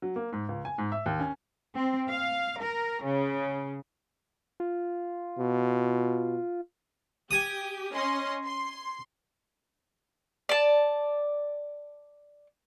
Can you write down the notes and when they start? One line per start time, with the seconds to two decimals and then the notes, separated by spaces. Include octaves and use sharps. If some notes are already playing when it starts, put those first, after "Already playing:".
0.02 F#3
0.16 A#3
0.33 G#2
0.49 C#2
0.65 G#5
0.78 G#2
0.92 E5
1.06 D#2
1.20 C#4
1.76 C4
2.09 F5
2.60 A#4
3.04 C#3
4.60 F4
5.39 B2
7.31 G4 G#5 D#6
7.95 C#4 D#5 C6
8.44 C6
10.49 D5 A5